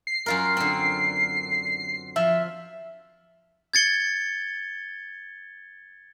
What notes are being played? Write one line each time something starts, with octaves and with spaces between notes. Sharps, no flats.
C7
F#2 F4 A#4
D3 C4
F3 E5
G#6 A6 C#7 G7